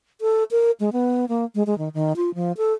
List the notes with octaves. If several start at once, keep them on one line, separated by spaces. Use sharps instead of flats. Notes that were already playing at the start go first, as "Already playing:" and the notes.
A4
A#4
G#3
B3
A#3
G#3
G#3
D#3
D#3
F4
F3
A4